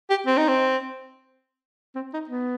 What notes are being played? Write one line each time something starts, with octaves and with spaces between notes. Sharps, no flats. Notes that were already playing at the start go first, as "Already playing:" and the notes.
G4
C4
D#4
C4
C4
D#4
B3